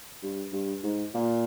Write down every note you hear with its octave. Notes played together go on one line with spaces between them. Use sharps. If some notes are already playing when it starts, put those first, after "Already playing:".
G2
G2
G#2
A#2